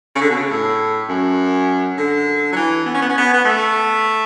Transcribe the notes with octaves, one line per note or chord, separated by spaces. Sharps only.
C#3
D3
B2
C#3
A2
F#2
D3
F#3
E3
B3
C#4
B3
C#4
B3
B3
A3